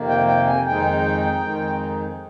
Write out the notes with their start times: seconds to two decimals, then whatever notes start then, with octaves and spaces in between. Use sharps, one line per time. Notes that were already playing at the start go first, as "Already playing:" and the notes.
Already playing: F2 C3 D#3 A#3
0.08 G5
0.27 G5
0.47 G#5
0.65 F2 D#3 G#3 D#4 G5
1.42 F2 D#3 G#3 D#4